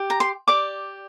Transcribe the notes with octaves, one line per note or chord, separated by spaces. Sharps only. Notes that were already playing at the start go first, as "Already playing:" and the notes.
Already playing: G4
A#5
C6
G4 D5 D6